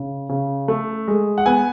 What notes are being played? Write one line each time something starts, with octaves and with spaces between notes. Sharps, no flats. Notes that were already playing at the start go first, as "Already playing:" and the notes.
Already playing: C#3
C#3
A3
G#3
F#5
B3 G#5